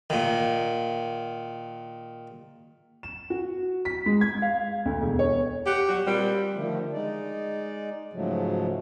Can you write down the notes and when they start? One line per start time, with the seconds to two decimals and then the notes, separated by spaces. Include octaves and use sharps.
0.10 A#2 D#3
3.03 E7
3.30 F#4
3.85 B6
4.06 G#3
4.21 G#6
4.42 F5
4.86 D2
5.02 E1
5.19 C#5
5.66 G4 F#5
5.89 F#3 G3 F#4
6.06 A#2 G3 C4
6.54 D3 D#3 F3 A3
6.93 G#3 D#4 D5
8.13 G#2 C#3 F3 F#3 G#3 A3